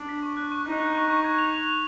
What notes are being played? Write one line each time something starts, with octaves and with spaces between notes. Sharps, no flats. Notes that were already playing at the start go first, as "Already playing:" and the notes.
Already playing: D4
B6
C#6
F#6
C#6
D#4 F#6
F#6
C#6
C#6
G#6
F7
F7
F7